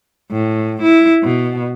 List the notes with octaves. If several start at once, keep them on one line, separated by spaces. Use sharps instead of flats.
A2
E4
B2